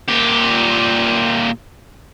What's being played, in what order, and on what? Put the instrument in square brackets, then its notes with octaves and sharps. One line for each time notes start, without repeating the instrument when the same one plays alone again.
[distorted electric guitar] A#2 G4